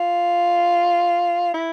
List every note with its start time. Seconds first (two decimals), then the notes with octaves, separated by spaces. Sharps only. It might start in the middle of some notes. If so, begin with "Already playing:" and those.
Already playing: F4
1.54 E4